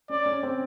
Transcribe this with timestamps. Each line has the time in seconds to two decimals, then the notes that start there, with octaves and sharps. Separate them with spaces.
0.10 C#4 D5
0.26 C#4
0.43 C4